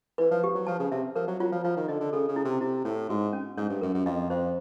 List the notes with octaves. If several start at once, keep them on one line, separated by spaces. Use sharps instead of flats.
E3 B4
F3
G4
F#3
F3 A5
C#3
C3 E5
F3 A#4
F#3
F#3 F4
F3
F3 F4
D#3
D3 D#5
D3
C#3 A4
C#3
E4
C3
C3 E4
A2 C#5
G#2 F#4
C#4
G#2 C#5
G2
F#2 A#4
F#2
F2 D#5
F2 C5